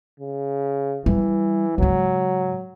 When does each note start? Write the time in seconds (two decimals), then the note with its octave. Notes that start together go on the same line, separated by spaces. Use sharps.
0.20 C#3
1.06 E3 G3
1.78 G#2 C#3 F#3